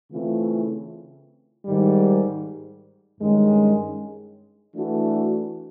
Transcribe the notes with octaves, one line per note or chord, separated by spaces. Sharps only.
C#3 E3 A3 C4 F4
G#2 D#3 G3
G2 D#3 G#3 C#4
E3 A3 D4 F#4 A4